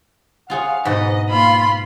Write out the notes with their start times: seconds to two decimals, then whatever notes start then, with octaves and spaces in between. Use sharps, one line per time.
0.50 F4 G#4 C#5 F5 F#5
0.85 G#2 B2 B4 D#5 F#5
1.30 A#3 F4 B5 C6